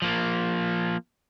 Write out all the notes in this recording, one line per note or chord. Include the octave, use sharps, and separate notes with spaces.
F3 A#3